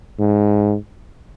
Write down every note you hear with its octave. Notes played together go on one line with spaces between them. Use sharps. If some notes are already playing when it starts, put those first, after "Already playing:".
G#2